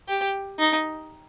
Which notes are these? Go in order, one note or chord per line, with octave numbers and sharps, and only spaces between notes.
G4
D#4